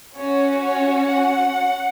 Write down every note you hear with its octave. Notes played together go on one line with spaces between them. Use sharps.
C#4 F#4 C#5
C#5
F#5